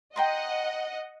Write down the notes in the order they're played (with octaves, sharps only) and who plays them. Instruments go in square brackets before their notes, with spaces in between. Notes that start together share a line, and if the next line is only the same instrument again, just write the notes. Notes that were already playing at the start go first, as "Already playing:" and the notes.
[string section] D#5 F#5 [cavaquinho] G5 A#5 C6